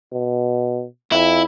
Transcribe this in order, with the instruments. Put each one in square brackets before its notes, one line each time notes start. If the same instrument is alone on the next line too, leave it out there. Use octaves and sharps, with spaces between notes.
[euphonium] B2
[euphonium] F2 [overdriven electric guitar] E4